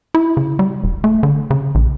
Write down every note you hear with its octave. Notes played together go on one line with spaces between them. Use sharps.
E4
C#3
G3
E1
A3
D3
C#3
A#1